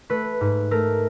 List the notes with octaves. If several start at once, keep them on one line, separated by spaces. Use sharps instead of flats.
A3 B4
G#2
A3 A#4